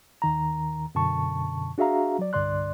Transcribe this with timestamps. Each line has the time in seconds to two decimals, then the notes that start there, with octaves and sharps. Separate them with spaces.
0.22 D#2 D#3 A#5
0.95 F#2 B2 D3 A5 C#6
1.78 D4 F#4 G#4 E5 F5 A#5
2.19 F#3 D5
2.33 C2 G2 D3 D5 C6 F#6